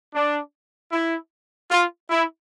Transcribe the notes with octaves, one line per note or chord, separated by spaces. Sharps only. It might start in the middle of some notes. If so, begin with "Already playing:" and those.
D4
E4
F4
E4